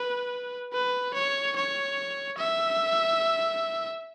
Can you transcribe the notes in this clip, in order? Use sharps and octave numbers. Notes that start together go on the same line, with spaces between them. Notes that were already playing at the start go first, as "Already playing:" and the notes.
Already playing: B4
B4
C#5
C#5
E5